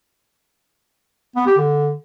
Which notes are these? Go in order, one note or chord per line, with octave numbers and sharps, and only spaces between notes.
B3
G4
D3